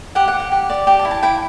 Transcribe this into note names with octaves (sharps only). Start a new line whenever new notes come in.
G4 F#5
F#5
G4
F#5
G4
D5
G4 G5
A5
E4
A5
E4 G5